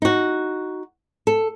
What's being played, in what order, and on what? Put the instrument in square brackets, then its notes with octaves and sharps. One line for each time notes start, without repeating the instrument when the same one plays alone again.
[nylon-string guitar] D#4 F#4
A4